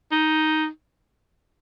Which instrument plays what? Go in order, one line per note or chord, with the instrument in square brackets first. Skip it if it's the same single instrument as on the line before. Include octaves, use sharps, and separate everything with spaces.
[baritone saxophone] D#4